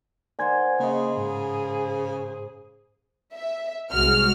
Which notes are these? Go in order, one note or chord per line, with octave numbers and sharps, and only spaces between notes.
A#4 C5 D5 F#5 G#5 G#6
C#3 A#3 G#4 D#5
G#2
E5
C2 G#3 F#4 F6